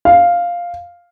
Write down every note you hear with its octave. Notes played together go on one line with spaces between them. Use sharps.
F5